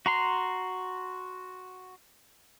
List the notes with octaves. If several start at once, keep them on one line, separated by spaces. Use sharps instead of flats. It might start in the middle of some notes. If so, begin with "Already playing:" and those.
F#4 A#5 C6